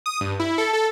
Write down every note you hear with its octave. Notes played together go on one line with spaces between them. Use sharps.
D#6
G2
E4
A4
A4